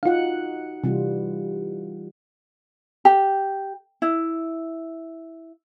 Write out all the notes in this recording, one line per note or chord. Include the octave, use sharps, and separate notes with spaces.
D#4 F4 F#4 F5 F#5
C3 E3 G3 F4
G4
E4